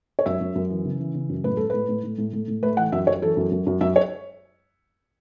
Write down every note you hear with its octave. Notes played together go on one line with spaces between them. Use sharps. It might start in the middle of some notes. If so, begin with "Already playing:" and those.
C#5
F#2 E5
F#2
F#2
E3
C#3
E3
C#3
F#2
A2 B4
A2 A4
A2 B4
A2
A2
A2
A2
A2
A3 B4
E3 F#5
F#2 E5
F#2 C#5
E3 A4
F#2
F#2
F#2
F#2 E5
C#5